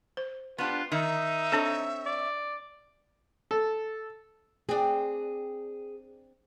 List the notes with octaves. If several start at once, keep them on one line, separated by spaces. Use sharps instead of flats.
C5
B3 D4 F4 G4
D#3 D#4 E5
C4 D4 A4 C#5
D5
A4
C4 D4 G#4